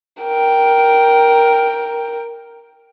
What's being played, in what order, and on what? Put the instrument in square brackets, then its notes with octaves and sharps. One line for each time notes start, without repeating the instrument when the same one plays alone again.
[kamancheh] A#4 G5